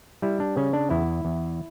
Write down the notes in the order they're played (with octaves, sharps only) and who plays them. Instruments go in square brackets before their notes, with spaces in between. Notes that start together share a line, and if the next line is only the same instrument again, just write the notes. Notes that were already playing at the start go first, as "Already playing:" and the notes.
[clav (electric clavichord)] G3 E4
D4
C#3 C#4
D4
E2 E4
E2